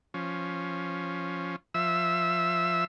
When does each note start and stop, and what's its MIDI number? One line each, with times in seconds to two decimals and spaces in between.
0.14 1.56 53
0.14 1.56 61
1.74 2.84 53
1.74 2.84 76
1.74 2.84 88